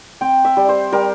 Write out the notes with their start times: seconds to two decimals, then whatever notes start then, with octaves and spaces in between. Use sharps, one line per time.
0.21 C4 G5
0.45 E5
0.57 G3
0.69 C5
0.92 G3 A#4